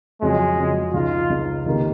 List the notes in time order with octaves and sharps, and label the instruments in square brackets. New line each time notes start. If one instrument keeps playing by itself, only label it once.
[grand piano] F2 C#3 F#3 C#4 F4 [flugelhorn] G#3
[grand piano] F2 C#3 F#3 C#4 F4
[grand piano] C#2 C#3 G#3 D#4 [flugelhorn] F4
[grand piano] C#2 C#3 G#3 D#4
C#2 C3 D#3 A#3